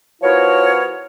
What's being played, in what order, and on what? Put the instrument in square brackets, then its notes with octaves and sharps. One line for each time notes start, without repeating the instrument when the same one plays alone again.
[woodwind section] F3 B3 E4 F#4 A#4 C#5